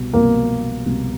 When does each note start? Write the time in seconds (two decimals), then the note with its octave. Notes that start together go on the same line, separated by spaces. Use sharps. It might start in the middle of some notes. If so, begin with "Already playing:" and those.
Already playing: C2 B2
0.13 C2 B2 A#3 A#4
0.86 C2 B2